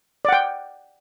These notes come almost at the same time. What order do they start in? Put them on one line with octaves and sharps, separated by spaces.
D5 F#5 G5